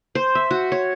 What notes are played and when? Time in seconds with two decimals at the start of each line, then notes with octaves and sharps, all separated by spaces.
0.15 C5
0.35 E5
0.51 F#4
0.72 C#5